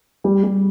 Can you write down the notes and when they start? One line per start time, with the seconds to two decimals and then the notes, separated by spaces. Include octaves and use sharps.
0.24 G3
0.43 G3